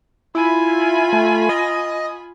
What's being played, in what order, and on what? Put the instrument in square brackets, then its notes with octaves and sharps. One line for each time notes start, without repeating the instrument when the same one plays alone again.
[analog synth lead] E4 [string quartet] F4 G#5 B5
[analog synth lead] A3
D#5